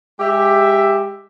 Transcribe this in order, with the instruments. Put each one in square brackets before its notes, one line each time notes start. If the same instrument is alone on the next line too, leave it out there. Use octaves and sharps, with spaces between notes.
[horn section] G#3 G4 E5